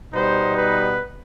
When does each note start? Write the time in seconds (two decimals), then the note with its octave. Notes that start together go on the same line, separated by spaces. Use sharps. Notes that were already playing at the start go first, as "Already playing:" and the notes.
0.13 B2 G3 B3 D#4 C5
0.57 B4